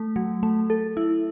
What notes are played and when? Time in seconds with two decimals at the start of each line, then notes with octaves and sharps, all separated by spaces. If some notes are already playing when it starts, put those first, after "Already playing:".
Already playing: A3
0.16 F#3
0.43 A3
0.70 A4
0.97 E4